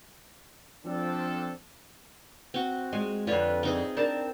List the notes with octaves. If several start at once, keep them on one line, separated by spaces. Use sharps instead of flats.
F3 C4 D4 A4
C4 F#4
G#3 F4 G#5
F2 D3 F4 B4 C#5
C4 D#4 G#4
C4 D4 A#4 A5